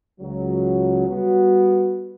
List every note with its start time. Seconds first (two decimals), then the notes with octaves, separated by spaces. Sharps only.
0.20 C#2 C#3 F#3
1.07 G3 B3 F#4